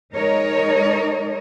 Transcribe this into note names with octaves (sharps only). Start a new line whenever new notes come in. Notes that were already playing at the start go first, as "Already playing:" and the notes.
G#3 D#4 A#4 C#5 D#5